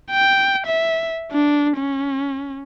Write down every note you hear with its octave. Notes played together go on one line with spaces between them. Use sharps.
G5
E5
D4
C#4